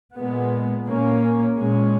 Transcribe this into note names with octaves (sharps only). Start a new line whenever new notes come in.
A#2 G#3 B3
A#2 A#3 C#4
A#2 G#3 C#4